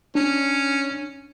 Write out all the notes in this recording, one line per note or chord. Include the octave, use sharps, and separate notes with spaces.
C#4 D4